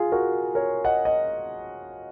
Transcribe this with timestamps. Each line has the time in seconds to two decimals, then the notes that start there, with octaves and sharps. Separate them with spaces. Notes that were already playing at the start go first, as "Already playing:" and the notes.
Already playing: F4 G#4
0.12 F#4 A#4
0.55 A#4 C#5
0.84 D#5 F#5
1.05 D#5